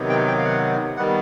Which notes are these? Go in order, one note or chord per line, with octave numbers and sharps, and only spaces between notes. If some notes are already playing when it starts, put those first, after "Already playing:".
Already playing: C3 D#3 F#3 B3
G5
G5
F5
F#5
D#3 G3 B3 F#5